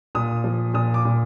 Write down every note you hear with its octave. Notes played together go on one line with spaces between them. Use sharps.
A#2 D#6
F3
A#2 D#6
D6
A#2